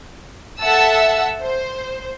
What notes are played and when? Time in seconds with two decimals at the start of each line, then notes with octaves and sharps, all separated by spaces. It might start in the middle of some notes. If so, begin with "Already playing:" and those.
0.60 A4 E5 F#5 A5 E6
1.42 C5